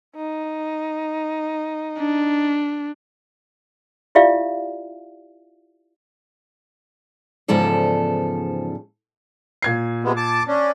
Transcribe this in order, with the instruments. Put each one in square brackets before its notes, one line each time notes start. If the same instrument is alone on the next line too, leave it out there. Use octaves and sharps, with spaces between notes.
[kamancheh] D#4
[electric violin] D4
[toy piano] E4 F4 G4 D5 E5 F5
[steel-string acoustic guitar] E2 G#2 C#3 F3 A4 D5
[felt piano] A#2 G#6 C7
[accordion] C3 G#3 B3
A5 D6
C#4 D4